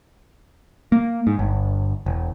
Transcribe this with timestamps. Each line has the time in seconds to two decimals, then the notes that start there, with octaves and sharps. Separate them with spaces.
0.92 A#3
1.27 G#2
1.39 G1
2.06 E1